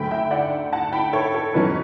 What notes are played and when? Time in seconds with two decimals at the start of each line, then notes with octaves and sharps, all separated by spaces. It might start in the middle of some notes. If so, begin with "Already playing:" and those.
Already playing: D2 D3 F#3 A3 G5 B5
0.11 E5 G5
0.31 D5 F#5
0.73 F#5 A5
0.93 G5 B5
1.13 A4 C#5
1.34 A4
1.54 E2 B2 F#3 C#4 B4